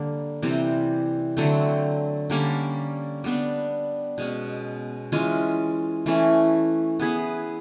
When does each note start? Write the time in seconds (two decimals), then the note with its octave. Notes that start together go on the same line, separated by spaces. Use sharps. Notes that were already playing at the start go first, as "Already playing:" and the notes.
Already playing: D3 G3 A#3
0.42 C3 E3 G3 C4
1.37 D3 F#3 A3 C4
2.30 D3 G3 A#3 C#4
3.24 G3 B3 D4
4.18 B2 G#3 C#4
5.12 E3 G#3 C#4 F4
6.06 E3 A3 C#4
7.00 B3 E4 G#4 B4